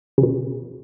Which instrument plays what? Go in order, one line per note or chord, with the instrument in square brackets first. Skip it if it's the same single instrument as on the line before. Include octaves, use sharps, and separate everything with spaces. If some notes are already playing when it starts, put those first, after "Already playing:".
[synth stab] C#3
B2